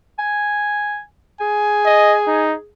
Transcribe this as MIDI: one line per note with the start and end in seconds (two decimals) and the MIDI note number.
0.18 1.01 80
1.41 2.71 68
1.41 2.46 80
1.85 2.16 75
2.27 2.55 63